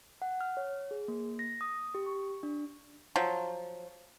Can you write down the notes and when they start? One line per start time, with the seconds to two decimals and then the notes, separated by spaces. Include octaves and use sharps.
0.22 F#5
0.41 F6
0.57 C#5
0.91 G#4
1.08 A#3
1.39 A#6
1.61 D#6
1.95 G4
2.06 C#6
2.43 D4
3.16 F3 F#3